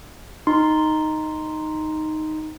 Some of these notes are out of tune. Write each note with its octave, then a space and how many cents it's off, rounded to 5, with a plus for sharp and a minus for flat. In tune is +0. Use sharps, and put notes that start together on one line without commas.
D#4 +0 C6 +0